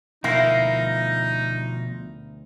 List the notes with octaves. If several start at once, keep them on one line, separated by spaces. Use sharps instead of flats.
D2 B2 F3 D#4 E4 A#4 F5